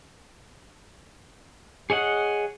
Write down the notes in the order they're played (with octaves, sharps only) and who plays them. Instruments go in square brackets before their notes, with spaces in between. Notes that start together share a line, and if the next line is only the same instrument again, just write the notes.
[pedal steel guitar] G#4 C#5 D#5 F#5